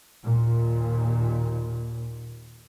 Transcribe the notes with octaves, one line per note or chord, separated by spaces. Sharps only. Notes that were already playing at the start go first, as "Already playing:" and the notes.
D#2 A#2